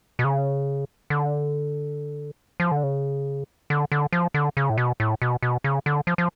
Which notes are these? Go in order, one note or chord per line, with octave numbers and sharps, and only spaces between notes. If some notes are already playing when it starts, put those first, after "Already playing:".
B2
C#3
D3
F3
D3
C#3
D3
D3
F3
D3
C#3
A2
B2
A2
B2
B2
C#3
D3
F3
F3